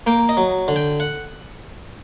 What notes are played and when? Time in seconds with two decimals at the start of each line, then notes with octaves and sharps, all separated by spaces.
0.07 A#3 G5
0.29 D#5
0.37 F#3
0.68 D3
0.76 G5
1.00 F#5